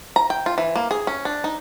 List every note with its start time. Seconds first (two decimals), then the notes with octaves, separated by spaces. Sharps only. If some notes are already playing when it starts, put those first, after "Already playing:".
0.16 A#5
0.30 G5
0.46 F4
0.58 E3
0.76 A#3
0.91 G#4
1.07 C#4
1.25 D4
1.44 D#4